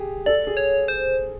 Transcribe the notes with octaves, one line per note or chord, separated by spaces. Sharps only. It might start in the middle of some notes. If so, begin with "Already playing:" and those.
Already playing: G4 G#4
A4 D5
G#4
C#5
C5